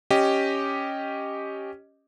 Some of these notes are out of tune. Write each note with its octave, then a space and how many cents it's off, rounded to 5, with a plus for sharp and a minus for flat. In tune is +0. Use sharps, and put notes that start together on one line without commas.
C#4 +0 G4 +0 D#5 +0